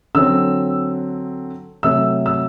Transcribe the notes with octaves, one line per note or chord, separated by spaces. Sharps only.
D3 F#3 C4 E6
C3 F#3 A3 E6
E6